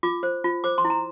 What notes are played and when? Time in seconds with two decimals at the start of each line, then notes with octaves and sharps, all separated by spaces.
0.03 F4 D6
0.23 C5
0.44 F4
0.64 C5 D6
0.78 C6
0.85 E4
0.90 A#5